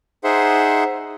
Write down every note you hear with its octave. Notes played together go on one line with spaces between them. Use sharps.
D#4 G#4 C5 E5 F#5 C6